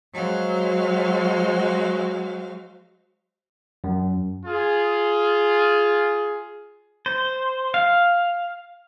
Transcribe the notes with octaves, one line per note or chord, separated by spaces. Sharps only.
F#3 G#3 F#4 C5 F5
F#2
F4 G#4
C5
F5